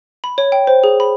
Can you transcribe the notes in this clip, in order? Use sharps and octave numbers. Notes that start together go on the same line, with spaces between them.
B5
C#5
G5
C5
G#4
B5